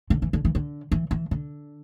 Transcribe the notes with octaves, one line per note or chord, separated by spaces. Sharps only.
D3
E3
D3
E3
D3
E3
E3
D3